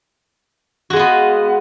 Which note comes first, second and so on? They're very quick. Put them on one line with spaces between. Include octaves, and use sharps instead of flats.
F#4 G#3 F4 B3